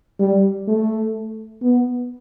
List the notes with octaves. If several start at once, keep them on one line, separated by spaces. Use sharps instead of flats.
G3
A3
B3